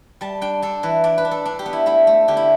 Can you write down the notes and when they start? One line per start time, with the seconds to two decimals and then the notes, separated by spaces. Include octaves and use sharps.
0.21 G3 A5
0.41 D4 G5
0.62 D4 A4
0.83 E3 B4
1.04 D4 D5
1.18 B4
1.25 D4
1.31 A4
1.45 D4
1.59 G4
1.66 B3
1.73 E4
1.86 A3 E4
2.07 A3
2.28 D3 G4
2.37 E4